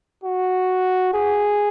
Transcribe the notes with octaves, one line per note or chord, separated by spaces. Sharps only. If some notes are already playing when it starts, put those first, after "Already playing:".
F#4
G#4